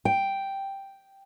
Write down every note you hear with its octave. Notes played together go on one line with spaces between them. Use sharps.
G5